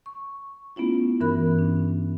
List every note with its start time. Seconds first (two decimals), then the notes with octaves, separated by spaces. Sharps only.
0.06 C#6
0.76 A3 B3 C#4 E4 F4
1.20 G2 E3 C#4 A#4 B5 F#6
1.59 D4